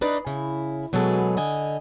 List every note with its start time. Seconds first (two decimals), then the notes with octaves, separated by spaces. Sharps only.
0.01 D4 D#4 B4 D5 D#5
0.27 C#3 E4
0.93 B2 F#3 G#3 G#4 A4 B4
1.37 D3 D#5 G#5